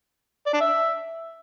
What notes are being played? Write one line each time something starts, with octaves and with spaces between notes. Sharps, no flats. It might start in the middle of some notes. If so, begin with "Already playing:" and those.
D5
D4
E5